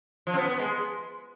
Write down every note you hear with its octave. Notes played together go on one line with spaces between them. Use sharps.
F3
C4
B3
B3
G#3